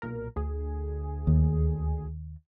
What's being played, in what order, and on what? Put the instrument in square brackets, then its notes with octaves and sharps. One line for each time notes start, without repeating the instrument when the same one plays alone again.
[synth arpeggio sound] B1 A#2 A#4
D2 G#4
[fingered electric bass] D#2